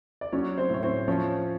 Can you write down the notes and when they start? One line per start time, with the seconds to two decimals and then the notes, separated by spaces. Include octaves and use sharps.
0.21 D5
0.32 F#3 C#4 C#5
0.58 C4 C5
0.70 A2 C#5
0.83 C4 C5
1.08 F3 C#4 C#5